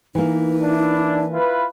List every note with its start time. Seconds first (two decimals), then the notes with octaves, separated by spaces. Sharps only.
0.15 E3 A#3 D#4
0.62 D4 E4
1.32 E4 F4 B4